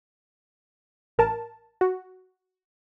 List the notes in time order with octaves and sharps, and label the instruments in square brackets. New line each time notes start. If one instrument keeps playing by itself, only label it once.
[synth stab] A1 A#4 A5
F#4